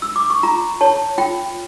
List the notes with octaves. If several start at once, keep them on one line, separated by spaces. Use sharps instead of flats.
E6
D6
C#6
F4 A#5
C#5 A5
F4 G5